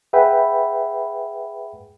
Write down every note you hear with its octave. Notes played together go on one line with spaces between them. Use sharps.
G#4 B4 E5 F#5 G5 B5